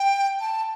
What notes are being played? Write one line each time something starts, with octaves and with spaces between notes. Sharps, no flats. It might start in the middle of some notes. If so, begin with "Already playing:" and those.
Already playing: G5
A5